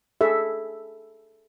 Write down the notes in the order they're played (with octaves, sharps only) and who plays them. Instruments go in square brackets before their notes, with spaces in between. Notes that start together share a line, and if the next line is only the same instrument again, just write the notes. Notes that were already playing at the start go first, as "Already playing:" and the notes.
[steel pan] G#4 A4 E5